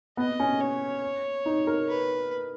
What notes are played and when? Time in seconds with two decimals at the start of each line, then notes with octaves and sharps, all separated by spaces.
0.17 B3 D#5
0.40 C#4
0.60 C#5
1.46 D#4
1.67 A#4
1.88 B4